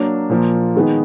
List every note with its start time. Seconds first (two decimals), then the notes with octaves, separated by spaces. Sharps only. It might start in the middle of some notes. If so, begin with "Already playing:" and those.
Already playing: F#3 A#3 D4
0.30 A#2 F3 A#3
0.76 D#3 G#3 B3 D#4